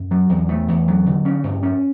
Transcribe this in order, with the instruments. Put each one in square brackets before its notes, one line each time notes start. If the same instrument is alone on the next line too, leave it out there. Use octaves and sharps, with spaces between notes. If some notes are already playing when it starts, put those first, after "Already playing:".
Already playing: [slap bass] F#2
F#3
E2
A3
E2
F#3
D3
C#4
G2
C#4